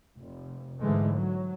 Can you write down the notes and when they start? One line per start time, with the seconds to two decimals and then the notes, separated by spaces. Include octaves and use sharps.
0.18 F1
0.81 G#2 D3 E3 G#3 A3
1.13 F#3